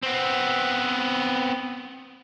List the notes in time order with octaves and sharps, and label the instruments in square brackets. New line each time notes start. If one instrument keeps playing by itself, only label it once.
[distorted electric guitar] B3 C4